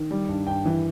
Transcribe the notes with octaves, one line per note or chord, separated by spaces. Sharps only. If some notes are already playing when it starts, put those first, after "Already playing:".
Already playing: D#3
G3
G2
G2 G5
E3